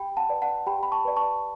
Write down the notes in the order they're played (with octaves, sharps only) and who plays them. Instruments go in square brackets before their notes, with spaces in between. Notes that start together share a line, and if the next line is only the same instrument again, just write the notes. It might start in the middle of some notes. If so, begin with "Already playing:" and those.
Already playing: [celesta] G4 G5 B5
F#5 A5
B4 D5
F#5 A5
G4 G5 B5
B5
A5 C#6
B4 D5
A5 C#6